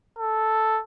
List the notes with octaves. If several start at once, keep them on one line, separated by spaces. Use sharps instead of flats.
A4